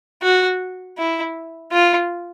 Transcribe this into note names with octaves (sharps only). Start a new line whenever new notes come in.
F#4
E4
F4